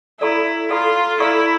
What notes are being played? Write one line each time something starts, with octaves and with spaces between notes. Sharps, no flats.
E4 A4 D5 F5 A#5 C#6
F4 A4 D5 F5 A#5 C#6
E4 A4 D5 F5 A#5 C#6